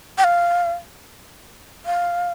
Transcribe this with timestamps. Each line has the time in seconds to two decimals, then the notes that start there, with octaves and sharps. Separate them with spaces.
0.18 G5
0.24 F5
1.86 F5